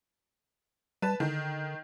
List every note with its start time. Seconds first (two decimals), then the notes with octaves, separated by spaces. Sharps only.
1.02 G3 B4 A5
1.20 D3 D#3